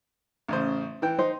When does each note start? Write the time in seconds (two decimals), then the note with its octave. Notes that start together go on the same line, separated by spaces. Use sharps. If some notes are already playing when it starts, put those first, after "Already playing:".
0.48 A1 C#3 C5
1.02 E3 G5
1.19 D#4 C5